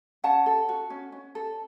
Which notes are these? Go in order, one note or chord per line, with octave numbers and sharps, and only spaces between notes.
C#4 F#5 A5
A4
F#4
C#4
C#4
A4